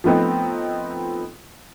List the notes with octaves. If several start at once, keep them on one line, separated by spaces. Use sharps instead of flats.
F3 A3 B3 C4 D#4